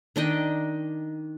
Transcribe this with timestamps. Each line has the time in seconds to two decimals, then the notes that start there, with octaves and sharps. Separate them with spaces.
0.16 D#3 D4 D#5 G5